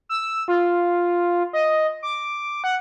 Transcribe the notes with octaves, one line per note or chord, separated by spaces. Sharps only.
E6
F4
D#5
D6
F#5